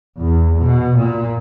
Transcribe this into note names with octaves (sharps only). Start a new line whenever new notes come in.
E2
B2
A#2